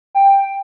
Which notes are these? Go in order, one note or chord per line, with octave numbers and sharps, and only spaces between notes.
G5